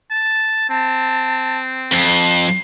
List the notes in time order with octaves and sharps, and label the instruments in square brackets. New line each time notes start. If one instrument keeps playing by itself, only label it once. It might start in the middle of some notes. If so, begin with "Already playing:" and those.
[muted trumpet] A5
[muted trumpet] C4 [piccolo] A5
[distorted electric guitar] F2 [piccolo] C7